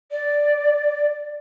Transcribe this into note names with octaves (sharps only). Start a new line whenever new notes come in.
D5